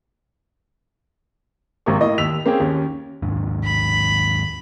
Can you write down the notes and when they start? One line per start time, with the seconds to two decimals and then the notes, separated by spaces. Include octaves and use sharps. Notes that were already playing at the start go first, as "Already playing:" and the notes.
1.86 G#1 C3 G4 A#4 C#6
2.00 A2 A#3 D#5
2.18 D#2 E6 B6 F7
2.46 A#3 C4 C#4 G#4 G5
2.60 D#2 C#4
3.22 D#2 G#2 D4
3.65 B5